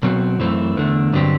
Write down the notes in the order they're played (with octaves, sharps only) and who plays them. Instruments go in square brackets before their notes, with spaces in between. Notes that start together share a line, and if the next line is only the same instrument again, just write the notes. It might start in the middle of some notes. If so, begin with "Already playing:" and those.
[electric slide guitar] B2 F#3 C4 F#4
F#2 E3 A3 C4
E2 D3 A3
G2 D3 F#3 C4 G4